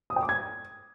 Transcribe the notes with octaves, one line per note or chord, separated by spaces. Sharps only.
D#6
G5
D6
G#6